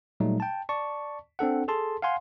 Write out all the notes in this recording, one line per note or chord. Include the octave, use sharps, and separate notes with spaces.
A#2 F#3 G3 A3 D#4
G5 A5
D5 A5 C#6
C4 D4 A4 F#5
G#4 A4 A5 C6
F5 F#5 G#5 C6